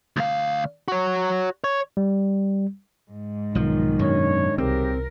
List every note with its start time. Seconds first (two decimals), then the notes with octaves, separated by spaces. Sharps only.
0.17 D2 F5
0.88 F#4 C#5
1.64 C#5
1.97 G3
3.11 G#2
3.55 B1 D#3 F3
3.99 F#2 B2 D4 C#5
4.58 C2 C#3 C4 G4 A#4